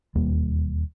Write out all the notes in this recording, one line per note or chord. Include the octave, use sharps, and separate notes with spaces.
E1 D#2 G3 A#3